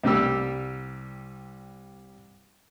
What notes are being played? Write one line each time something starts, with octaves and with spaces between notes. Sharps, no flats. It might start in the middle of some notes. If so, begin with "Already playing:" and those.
C2 G3 G4 E6